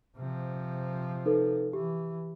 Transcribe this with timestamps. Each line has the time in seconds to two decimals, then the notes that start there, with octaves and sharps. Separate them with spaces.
0.16 C3 F3
1.26 D#4 A4 B4
1.73 E3 G4